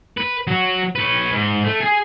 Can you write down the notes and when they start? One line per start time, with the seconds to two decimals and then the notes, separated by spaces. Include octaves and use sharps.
0.18 B4
0.47 F#3 F#4
0.95 B4 C#5
1.32 G#2
1.64 A3
1.80 G#4 G#5